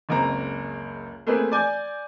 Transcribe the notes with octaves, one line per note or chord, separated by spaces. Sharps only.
F#1 C#2 C4 A#5
A3 A#3 C4 G#4 B4
D5 G#5 G6